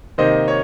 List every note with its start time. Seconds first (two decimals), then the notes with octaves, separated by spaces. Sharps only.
0.18 C3 D#3 A#3 C5 D#5
0.48 C#5